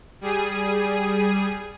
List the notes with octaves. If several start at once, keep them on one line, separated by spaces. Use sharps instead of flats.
G3 G#4 D#7